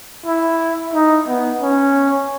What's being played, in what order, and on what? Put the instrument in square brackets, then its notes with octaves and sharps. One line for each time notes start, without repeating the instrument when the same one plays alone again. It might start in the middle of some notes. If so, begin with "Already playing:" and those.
[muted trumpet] E4
D#4
B3
C#4